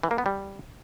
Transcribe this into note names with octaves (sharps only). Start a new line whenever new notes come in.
E3
A#3
B3
G3